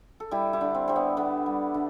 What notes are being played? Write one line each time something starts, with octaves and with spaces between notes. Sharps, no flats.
A4
G3 E4 G4
E4 G4
D3
C4
G3 C4
B3
D3 B3
G3
D3